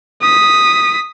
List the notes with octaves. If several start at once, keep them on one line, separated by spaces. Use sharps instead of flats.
D#6 B6